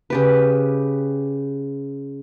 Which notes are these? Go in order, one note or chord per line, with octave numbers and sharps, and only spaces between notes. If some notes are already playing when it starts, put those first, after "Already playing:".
C#3 G4 B4